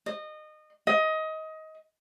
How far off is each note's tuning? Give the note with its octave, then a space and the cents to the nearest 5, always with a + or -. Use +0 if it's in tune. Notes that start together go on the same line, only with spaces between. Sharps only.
D#5 -25
D#5 +20